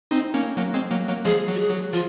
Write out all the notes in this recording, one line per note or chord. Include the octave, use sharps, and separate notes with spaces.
C4 D#4
A#3 C#4
F#3 A#3
G#3 C4
F#3 A#3
F#3 A#3
F3 G#3 G#4
F#3
F#4
G#4
F#3
F3 F4